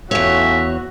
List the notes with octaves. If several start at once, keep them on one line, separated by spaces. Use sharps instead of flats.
E2 A2 C#4 F4 F#4 C#5 E5